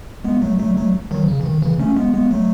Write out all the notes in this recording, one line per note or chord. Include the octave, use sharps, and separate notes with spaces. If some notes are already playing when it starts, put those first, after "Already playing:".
G#3 B3
F#3 A3
F#3 A3
F#3 A3
D#3 F#3
C#3
E3
D#3
C#3 E3
A3 C#4
G#3 B3
G#3 B3
F#3 A3